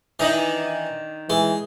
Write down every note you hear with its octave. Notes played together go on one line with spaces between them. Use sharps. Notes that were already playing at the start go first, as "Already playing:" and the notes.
D#3 E3 D4 D#5
E3 G#3